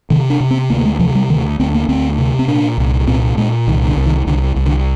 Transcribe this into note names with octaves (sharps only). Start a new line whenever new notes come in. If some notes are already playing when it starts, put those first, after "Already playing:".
C3 D#3
D4
C3
C4
D2 A#3
G#3
C3 F3
G3
D2 D#3
D2 C4
A#3
D2 C4
C3
C4
A#2 D4
C2
A#2 C4
A#2 G#3
C2 D#3
D3
C2
D#3
C2 D3
C2
D3